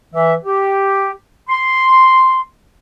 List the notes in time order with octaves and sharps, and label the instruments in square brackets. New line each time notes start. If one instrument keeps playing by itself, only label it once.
[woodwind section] E3 E5
G4
C6